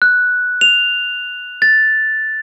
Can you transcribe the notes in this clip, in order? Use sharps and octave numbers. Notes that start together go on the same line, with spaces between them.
F#6
F7
A6